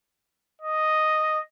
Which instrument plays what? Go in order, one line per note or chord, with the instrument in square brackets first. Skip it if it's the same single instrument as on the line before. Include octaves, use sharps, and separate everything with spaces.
[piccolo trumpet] D#5